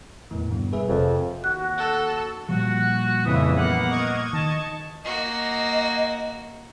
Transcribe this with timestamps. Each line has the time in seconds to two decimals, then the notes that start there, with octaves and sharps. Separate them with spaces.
0.31 E2 A2 D#3 E3
0.50 G2 B2 D3
0.73 G3 G#3 G#4 B4 E5
0.88 F1 F2
1.44 D#2 F#4 F#6
1.78 A4
2.49 A#2 F3 G3 F#4
2.80 F#6
3.25 F2 C#3 E3 E5 D#6
3.56 A#3 B3 F#5
3.90 D#5 C#6 G#6
4.33 D#3 A5
5.04 A#3 F#4 D#5